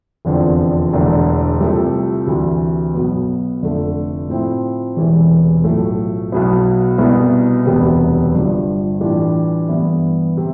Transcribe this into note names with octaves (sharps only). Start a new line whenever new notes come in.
F1 E2 D3 F3 C4
E1 E2 D3 A3
C2 C3 F3 A3
D2 C3 E3
B1 B2 B3
F1 F2 D3 A3
A2 F3 C4 E4
E1 E2 C3 E3
B1 A2 F3 A3
B1 B2 B3 E4
C2 B2 B3 E4
E1 D2 C3 G3 B3
G1 G2 F3
A2 E3 G3 D4 F4
G2 E3 B3 E4
C3